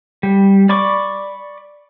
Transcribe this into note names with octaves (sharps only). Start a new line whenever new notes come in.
G3
D5 B5 C#6 D6